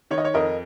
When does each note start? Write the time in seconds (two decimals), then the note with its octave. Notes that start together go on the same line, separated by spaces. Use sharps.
0.11 D#3 C#5
0.18 D#5
0.25 C#5
0.34 F2 A#4 D#5